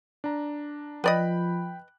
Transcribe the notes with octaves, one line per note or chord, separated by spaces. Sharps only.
D4 A#5
F3 B4 D5 D#5 G5 B5 F#6